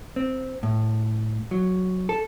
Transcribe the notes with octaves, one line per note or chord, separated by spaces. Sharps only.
C4
A2
F#3
A4